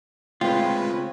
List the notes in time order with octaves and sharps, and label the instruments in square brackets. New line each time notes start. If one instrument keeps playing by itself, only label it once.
[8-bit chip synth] C#3 G#3 B4 [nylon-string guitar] A3 C#4 G5 [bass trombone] C4 [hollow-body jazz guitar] F4